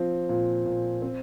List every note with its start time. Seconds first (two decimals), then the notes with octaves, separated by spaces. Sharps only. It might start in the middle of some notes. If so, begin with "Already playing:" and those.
Already playing: F3 C4
0.29 A#2
0.66 A#2
1.02 C4